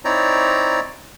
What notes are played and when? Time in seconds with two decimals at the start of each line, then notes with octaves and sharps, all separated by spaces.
0.05 C4 D#4 E4 C#5 D5 A#5